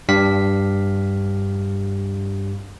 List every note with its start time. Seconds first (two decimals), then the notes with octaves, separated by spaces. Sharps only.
0.09 G2 D4 G4 F5 B6